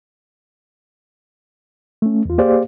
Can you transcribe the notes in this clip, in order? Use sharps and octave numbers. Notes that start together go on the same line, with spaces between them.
A3 C#4
E2 F4
A#3 G4 G#4 C5 D5 F5